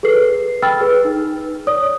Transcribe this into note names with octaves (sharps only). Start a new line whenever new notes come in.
G#4 A4 B4 C7
G5 B5 E6 F6 A6
G#4 B4
D#4
C#5 D5 D#6